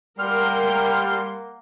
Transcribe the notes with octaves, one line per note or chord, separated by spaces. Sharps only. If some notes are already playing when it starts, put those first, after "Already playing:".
G3 A#3 A#4 F#5 C6 F6